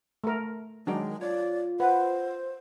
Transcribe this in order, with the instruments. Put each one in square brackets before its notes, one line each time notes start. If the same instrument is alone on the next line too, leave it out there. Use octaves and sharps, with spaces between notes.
[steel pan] A3 A#4
[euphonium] D#3 [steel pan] F#3 D4 [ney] G#3 [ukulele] G#4 A#4 G5
[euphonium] F4 [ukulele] C#5 [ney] D5
[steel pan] B4 [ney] C5 [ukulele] F#5